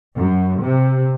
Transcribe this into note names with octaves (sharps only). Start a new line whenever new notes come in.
F#2
C3